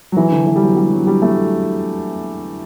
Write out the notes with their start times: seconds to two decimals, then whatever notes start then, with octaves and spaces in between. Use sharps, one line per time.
0.12 F#3
0.17 E3
0.32 D3
0.47 E3
0.56 G3
0.62 F#3
0.77 G3
0.91 F#3
1.07 G3
1.22 A3